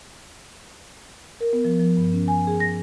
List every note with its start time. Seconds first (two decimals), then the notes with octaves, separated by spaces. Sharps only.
1.41 A#4
1.53 B3
1.65 F3
1.79 F3
1.97 G2
2.13 C#4
2.28 G#5
2.47 G#4
2.60 A#6